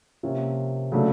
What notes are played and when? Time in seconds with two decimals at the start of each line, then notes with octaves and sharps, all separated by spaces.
0.23 C3 F3 A#3 C#4
0.92 C#3 F#3 A3 D4